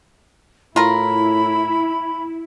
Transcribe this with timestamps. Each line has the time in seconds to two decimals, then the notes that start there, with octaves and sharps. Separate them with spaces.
0.76 A2 E4 F4 A#4 B5